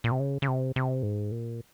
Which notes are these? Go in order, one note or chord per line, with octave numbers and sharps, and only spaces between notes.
A#2
C3
C#3
C#3
C3
C3
G#2
A#2